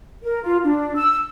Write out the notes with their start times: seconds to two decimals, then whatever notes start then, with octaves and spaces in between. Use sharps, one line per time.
0.23 A#4
0.42 F4
0.63 D4
0.95 E6